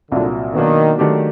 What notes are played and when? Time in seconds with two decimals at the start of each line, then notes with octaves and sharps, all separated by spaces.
0.12 C2 A#2 D3 F#3
0.55 B2 D#3 F#3 A#3 D4
0.99 D#3 F#3 A3 D4 G4